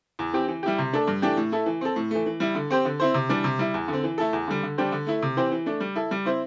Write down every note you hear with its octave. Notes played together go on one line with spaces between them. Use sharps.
E2
E3 C4 G4
E3
G3 E4 G4
C3
A3 D4 A4
G2
E3 A3 D4 G4
A2
A3 E4 A4
E3
C4 A4
A2
E3 A3
E3
G3 E4
D3
C4 G4 C5
D3
C4 E4 C5
C3
E3 G3 D4
C3
G3 E4
E2
D3 C4
E3
A3 E4 A4
E2
D3 G3
D3
G3 D4 G4 C5
D3
A3 E4
C3
E3 C4 G4 C5
E3
A3 D4
G3
E4 A4
G3
C4 E4 C5